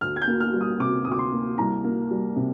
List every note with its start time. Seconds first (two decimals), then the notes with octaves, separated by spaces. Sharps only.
0.01 D2 F6
0.16 G#6
0.22 G6
0.27 A#3
0.40 F6
0.53 G3
0.61 D#6
0.80 C3 D6
1.05 D2 D#6
1.12 D6
1.19 C6
1.32 A#3
1.58 C2 A#5
1.84 A#3
2.11 G3
2.36 C3